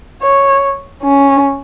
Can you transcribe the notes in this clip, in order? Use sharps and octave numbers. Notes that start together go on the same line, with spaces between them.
C#5
C#4